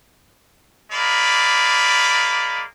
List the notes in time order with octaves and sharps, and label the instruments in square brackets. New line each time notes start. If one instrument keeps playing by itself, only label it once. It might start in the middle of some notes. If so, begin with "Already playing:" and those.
[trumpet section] G#3 A#3 D5 B5